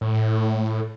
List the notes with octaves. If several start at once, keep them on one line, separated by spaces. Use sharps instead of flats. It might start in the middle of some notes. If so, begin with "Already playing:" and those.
A2